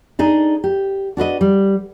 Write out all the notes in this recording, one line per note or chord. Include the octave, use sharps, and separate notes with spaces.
D4 D#4 G#4
G4
D4 F#4 B4 D#5
G3